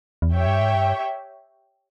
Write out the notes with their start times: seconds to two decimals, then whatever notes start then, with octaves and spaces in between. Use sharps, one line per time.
0.22 E2
0.32 F2 G4 C#5 E5 G5
0.46 G2
0.61 G#2
0.75 G2